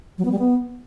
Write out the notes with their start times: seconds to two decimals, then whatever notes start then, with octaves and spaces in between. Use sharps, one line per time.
0.18 F#3
0.25 B3
0.32 G3
0.39 B3